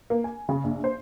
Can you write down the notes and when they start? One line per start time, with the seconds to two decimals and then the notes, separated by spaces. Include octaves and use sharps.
0.10 A#3
0.24 G#5
0.49 C#3
0.64 A#1
0.84 C5